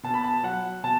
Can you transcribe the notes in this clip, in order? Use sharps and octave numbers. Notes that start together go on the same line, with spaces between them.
B2 A5
B5
A5
F#3 F#5
B2 A5